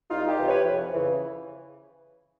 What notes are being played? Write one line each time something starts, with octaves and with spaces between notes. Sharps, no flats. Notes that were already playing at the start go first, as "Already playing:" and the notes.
C2 D#4 F4
F4 G4
C3 E3
B4 C#5
F2
C#3 E3